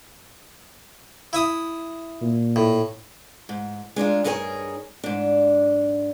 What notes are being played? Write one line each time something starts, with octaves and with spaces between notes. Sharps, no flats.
E4 E5 D#6
A#2
A2
G#2
G#3 D4 D#4 F4
G2 D#4 G#4 A#4 C#5 G#5
G#2 D4